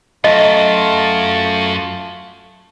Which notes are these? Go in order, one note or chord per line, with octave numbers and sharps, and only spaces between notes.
F#2 A3 F4 D#5